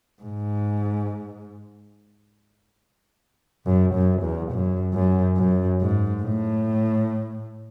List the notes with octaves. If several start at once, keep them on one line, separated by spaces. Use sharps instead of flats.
G#2
F#2
F#2
E2
F#2
F#2
F#2
G#2
A2